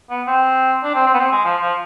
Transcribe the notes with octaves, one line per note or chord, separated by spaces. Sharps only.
B3
C4
D4
C4
C4
B3
C4
G#3
F3
F3